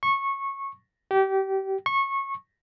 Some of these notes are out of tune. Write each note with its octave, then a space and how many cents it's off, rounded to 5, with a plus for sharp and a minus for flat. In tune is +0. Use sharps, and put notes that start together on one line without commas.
C#6 -15
G4 -25
C#6 -20